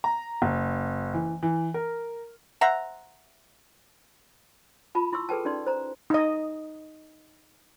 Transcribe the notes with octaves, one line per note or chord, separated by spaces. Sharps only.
A#5
F#1
E3
E3
A#4
C5 E5 F#5 A#5
F4 A5 B5
E4 C6 C#6 E6
G#4 A4 B4 G5 A5
C#4 D#4 D5 C6
C5 A#5
D#4 D#5